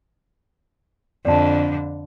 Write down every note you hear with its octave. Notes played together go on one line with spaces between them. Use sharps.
F2 D3 D5 A5